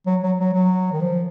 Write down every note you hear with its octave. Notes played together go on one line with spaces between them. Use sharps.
F#3
F#3
F#3
F#3
D#3
F3